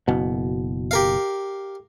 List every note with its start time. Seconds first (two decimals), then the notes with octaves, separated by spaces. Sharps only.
0.08 F#1 B2
0.91 G4 A#4 F5